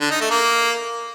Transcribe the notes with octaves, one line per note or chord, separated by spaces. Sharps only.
D3
D#4
A3
A#3